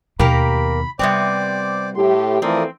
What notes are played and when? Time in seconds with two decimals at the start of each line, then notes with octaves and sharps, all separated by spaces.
0.19 D#2 B2 A#3 G4 A#4 B5
0.99 C3 G3 B3 C4 C5 D5 D6
1.95 A2 G4 C6
2.42 E3 F3 A3 C4 A#4 D5 D#6